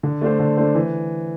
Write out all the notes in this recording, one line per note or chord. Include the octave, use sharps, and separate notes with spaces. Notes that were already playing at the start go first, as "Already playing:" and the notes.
D3
A3 D4 A4 C5
D3
A3 D4 A4 C5
E3